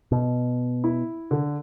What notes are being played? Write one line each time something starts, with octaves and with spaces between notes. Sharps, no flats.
B2
E4
D3